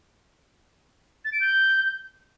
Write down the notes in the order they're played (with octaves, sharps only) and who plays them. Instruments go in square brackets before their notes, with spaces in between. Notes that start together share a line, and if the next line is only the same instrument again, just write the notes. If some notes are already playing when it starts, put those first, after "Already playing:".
[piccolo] A6
D7
G6